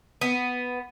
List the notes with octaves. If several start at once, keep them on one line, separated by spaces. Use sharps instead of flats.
B3